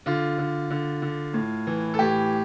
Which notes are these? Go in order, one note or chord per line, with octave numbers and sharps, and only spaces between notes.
D3 F4
D3
D3
D3
A2
E3
A4
A2 G4